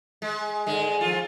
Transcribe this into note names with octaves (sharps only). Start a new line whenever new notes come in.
G#3
G#2 D3 G#3
F3 F4